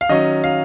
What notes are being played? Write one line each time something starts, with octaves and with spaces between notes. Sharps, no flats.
F5
D#3 F#3 C#4 D#5
F5